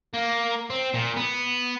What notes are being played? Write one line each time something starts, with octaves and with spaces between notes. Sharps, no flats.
A#3
C4
A#2
B3